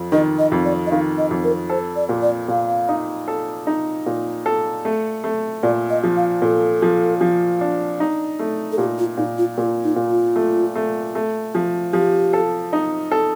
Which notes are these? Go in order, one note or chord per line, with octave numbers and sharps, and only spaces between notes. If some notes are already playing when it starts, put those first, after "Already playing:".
Already playing: F2
D#3 D#5
D#5
F2
D5
D#5
D#3 F5
D#5
F2
A#4
A4 C5
D5
A#2
D5
A#2 F5
D#4
A4
D#4
A#2
A4
A3
A3
A#2 D5
D#5
F3
F5
A#2 A4
F3
F3
D4
D#4
A3
A4
A#2 G4
F4
A#2 D#4
F4
A#2 F4
D#4
A#2
F4
A3
A3
A3
F3
F3 G4
A4
D#4
A4